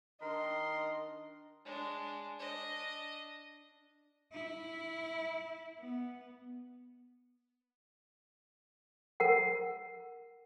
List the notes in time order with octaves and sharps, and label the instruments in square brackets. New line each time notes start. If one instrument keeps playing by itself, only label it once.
[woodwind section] D#3 D4 [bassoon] A#4 [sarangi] D#5 [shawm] C6
[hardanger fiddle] G#3 D4
D4 D#5
[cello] E4
B3
[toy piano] A#4 F#5